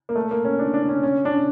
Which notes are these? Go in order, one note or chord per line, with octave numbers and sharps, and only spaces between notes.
A#3
A3
A#3
C#4
D4
D4
C#4
C#4
D4